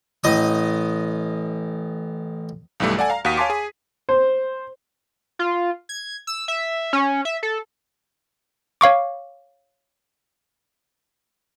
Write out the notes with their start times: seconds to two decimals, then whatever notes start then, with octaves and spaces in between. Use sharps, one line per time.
0.24 A1 D#5 D#6
2.80 B1 G2 E3 G3 A3
2.97 A4 D5 F#5 G#5
3.10 F5 A#5
3.25 D#2 F#4 F5 D#6 B6 D#7
3.37 C#5 F5 G#5 A5 C6 D6
3.50 G#4 G#5
4.09 C5
5.39 F4
5.89 G#6
6.27 E6
6.48 E5
6.93 C#4
7.25 E5
7.43 A4
8.81 C#5 F5 C#6 D6